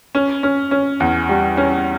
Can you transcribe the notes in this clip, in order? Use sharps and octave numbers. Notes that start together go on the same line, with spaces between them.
C#4
C#4
C#4
E2
G3
C#4